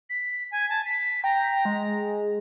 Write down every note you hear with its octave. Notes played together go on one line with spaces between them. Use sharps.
B6
G#5
A5
B6
G5 A#5
G#3